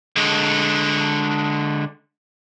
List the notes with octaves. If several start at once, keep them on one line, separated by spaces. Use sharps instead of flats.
D3 G#3